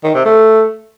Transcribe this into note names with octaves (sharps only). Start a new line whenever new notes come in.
D#3
C3
A3